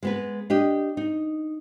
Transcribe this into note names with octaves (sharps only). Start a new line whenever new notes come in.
G#3 B3 B4
D4 G4 D#5
D#4